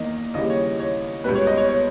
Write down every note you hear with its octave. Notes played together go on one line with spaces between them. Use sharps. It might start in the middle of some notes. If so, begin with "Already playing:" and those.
Already playing: E2 D#3 A#3 D#5
D#2 C#3 E3 G3 D#5
C#5
C#5
C#2 B2 G3 B3 B4
C#5
D#5
C#5
C#5